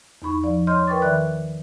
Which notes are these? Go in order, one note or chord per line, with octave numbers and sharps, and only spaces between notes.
E2 D#4 B5 C#6
F3 D5
C#5 D#5 C6 F6 G6
A#4 B4 G5 C#6 D6 A6
D#3 D5 E5 B5 F#6